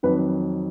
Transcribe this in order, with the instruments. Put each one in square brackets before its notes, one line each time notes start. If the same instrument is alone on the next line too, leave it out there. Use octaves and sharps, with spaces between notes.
[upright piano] F2 D#3 F#3 B4